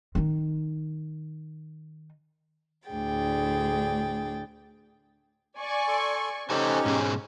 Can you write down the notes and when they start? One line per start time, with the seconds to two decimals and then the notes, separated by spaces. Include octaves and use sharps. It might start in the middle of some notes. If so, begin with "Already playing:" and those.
0.15 D#3 D#4
2.89 D2 A2 D4 G#4 G5 A6
5.58 D5 G#5 C#6
5.88 A4 C6
6.50 C#4 D#4 G4 A4 C5 G#5
6.86 G#2 B2 G#4